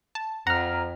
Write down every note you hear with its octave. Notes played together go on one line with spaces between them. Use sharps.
A5
F2 F#5 A#5 F6